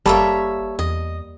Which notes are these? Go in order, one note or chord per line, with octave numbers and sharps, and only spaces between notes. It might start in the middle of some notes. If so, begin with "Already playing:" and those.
F#1 G3 A#3 A4 C#5 E5
E2 D#5